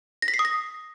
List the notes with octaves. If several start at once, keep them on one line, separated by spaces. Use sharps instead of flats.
A#6
B6
C7
D#6
A#6